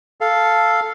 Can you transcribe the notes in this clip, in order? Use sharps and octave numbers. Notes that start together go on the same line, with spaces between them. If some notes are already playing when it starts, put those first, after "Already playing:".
A4 F5